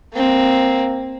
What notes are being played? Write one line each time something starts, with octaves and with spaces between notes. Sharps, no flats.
A#3 C4